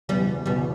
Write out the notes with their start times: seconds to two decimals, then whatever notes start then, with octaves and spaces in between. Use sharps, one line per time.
0.09 F#1 E2 B2 G3 B3
0.46 F#1 E2 B2 G3 B3